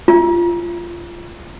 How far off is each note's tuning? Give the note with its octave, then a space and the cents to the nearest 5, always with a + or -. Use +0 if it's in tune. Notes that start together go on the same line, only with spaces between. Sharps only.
F4 -20